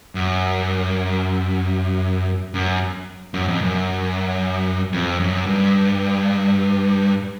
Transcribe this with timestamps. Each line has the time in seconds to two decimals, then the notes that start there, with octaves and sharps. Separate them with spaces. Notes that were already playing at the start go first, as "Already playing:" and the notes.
0.15 F#2
2.54 F#2
3.34 F#2
3.48 F2
3.62 F#2
4.93 F2
5.20 F#2
5.46 G2